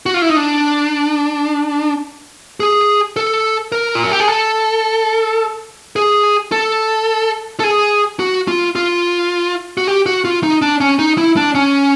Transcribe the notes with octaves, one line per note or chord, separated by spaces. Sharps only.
F#4
F4
E4
D#4
D4
G#4
A4
A#4
F4
F#4
G4
G#4
A4
G#4
A4
A4
G#4
F#4
F4
F4
F#4
G4
F#4
F4
D#4
D4
C#4
D#4
E4
D4
C#4